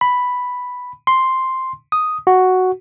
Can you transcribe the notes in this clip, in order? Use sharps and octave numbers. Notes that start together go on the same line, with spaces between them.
B5
C6
D#6
F#4